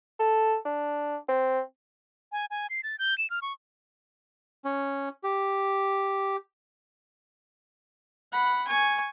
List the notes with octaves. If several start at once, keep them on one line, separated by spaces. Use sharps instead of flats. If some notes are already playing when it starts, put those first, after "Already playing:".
A4
D4
C4
G#5
G#5
C7
A6
G6
E7
F6
C#6
C#4
G4
F#5 B5
G#5 C#6